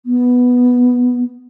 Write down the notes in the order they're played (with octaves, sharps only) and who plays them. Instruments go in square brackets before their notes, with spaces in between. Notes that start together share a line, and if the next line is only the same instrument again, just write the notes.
[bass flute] B3